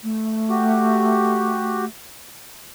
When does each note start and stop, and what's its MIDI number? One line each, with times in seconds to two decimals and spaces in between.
0.03 1.86 57
0.49 1.85 66
0.49 1.85 67